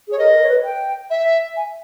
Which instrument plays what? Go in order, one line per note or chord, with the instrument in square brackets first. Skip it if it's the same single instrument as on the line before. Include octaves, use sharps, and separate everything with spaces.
[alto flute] G#4 [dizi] C#5
[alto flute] A#4 [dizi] D#5
[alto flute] A#4
C#5
B4
G5
[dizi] E5
[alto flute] G#5